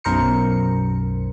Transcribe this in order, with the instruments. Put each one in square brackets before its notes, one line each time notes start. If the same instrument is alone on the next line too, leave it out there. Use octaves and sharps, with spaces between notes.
[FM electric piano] B1 F#2 A#4 C5 C#7